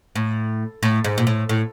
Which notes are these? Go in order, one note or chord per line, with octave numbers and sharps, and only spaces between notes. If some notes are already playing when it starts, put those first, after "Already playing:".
A2
A2
G#2
A#2
A2
A2